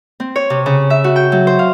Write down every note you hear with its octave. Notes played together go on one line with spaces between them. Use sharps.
C4
C#5
C3
C#3
E5
F#4
G5
F#3
C5
F5